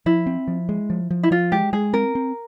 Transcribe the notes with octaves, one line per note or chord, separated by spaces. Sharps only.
F3 E4
C4
F3
G#3
F3
F3
E4
F3 F4
G#3 G4
G#3 G#4
C4 A#4
C4